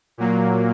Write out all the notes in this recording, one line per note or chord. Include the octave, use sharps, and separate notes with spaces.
A#2 F#3 A#3